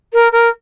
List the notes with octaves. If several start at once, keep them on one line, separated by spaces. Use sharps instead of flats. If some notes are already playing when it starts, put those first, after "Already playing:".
A#4
A#4